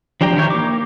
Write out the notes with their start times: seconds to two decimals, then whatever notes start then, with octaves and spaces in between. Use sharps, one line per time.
0.21 F3 D4 G4 G5 A#5
0.36 D#3 E4 A#4 C#5 G6
0.50 A#3 D6